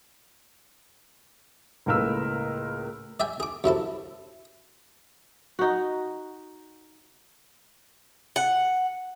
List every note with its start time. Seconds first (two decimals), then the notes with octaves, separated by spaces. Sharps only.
1.86 C#2 A2 A#3 A#4 B4 E6
3.20 D5 E5 G5 G#5
3.40 G#4 D6
3.64 F#2 C3 E4 A4
5.59 D#4 F#4
8.36 F#5